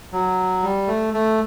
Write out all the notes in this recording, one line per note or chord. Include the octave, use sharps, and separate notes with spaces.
F#3
G3
A3
A3